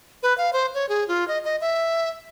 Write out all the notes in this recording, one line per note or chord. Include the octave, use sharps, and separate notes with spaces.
B4
F5
C5
C#5
G#4
F4
D#5
D#5
E5